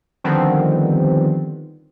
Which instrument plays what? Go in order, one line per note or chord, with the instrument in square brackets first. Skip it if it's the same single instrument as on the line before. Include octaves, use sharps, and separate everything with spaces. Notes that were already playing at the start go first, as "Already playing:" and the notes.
[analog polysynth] D3 D#3 F3 G3 B3 C4